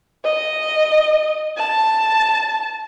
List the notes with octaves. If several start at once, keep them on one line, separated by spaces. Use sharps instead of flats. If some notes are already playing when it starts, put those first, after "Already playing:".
D#5
A5